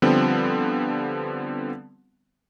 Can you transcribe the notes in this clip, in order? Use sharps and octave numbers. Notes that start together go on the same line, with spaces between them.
D3 F3 G3 B3 C4